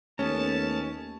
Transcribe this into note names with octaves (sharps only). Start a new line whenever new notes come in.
D#2 A3 B3 C#4 A5